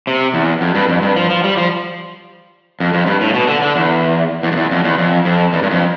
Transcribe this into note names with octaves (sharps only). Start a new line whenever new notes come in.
C3
E2
F2
G2
F2
G2
F3
F3
G3
F3
F2
F2
G2
A2
B2
D3
D3
E2
E2
F2
E2
F2
E2
F2
F2
E2
G2
F2